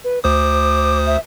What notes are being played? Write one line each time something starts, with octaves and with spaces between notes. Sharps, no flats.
B4
D2 C5 D6 D#6
E5